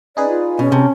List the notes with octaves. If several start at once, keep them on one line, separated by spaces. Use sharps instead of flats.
C#4 D#4 G#4 B4 D5
F4
B2 C#4
C3 A5